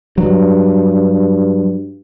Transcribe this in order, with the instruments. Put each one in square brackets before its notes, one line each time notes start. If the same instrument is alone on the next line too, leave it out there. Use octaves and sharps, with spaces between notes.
[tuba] G2 [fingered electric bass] F#3